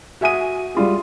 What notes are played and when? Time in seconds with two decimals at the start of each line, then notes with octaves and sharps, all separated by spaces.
0.21 F#4 E5 G#5 D#6 D#7
0.75 G3 F4 G#4